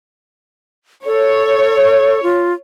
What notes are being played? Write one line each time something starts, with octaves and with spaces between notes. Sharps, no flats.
A4 C#5
F4